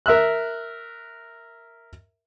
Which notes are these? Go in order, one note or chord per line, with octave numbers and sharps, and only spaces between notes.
A#4 E5 E6 F#6